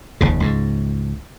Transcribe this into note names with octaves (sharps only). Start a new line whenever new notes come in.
F1 D#2 C#3
C#2 G#2